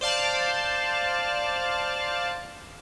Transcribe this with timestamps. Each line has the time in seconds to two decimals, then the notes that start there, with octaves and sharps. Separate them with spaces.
0.01 C5 D5 F5 A5